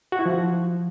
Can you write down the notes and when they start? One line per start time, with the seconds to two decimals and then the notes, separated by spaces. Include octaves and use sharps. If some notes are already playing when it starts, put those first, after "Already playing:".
0.12 F#4
0.19 E4
0.26 F3